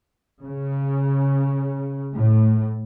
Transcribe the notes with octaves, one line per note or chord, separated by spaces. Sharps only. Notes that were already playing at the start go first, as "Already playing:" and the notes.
C#3
A2